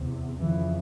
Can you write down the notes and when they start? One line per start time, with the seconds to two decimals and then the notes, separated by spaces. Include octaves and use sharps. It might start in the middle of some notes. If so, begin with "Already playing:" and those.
Already playing: E2 C3
0.40 F2 C#3 E3